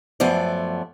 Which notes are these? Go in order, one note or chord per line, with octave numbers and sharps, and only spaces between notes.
F#2 F3 A3 B3 D5